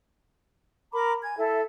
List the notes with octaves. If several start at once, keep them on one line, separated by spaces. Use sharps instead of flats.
A#4 A#5 B5 D6
G#5 G#6
E4 A4 E5